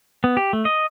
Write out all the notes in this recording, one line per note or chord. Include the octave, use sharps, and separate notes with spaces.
B3
G4
A3
D#5